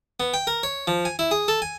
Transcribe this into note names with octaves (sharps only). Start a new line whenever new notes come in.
B3
G5
A#4
C#5
F3
G#5
E4
G#4
A4
G#5